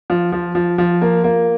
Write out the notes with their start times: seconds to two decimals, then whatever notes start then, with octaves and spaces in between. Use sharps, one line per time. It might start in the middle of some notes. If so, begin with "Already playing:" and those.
0.10 F3
0.32 F3
0.55 F3
0.78 F3
1.01 A#3
1.24 A#3